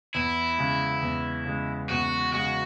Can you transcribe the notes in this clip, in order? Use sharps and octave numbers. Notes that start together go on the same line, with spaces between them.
E2 E4
C#3 G#3
E2
C#3 G#3
E2 F#4
C#3 G#3 F#4